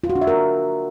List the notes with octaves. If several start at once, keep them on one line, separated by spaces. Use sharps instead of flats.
F4
F#4
D4
E5
A#4